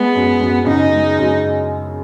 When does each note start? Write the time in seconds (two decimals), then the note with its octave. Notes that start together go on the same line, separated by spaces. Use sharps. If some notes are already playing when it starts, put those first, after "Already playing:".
Already playing: G#3 B3
0.15 F#2
0.40 F#2
0.66 C#3 D#4
0.93 G#3
1.19 F#2